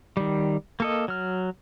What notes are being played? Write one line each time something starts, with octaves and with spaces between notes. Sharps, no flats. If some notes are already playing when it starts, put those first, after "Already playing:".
D#3 G3
A#3 A4 D#5
F#3 F6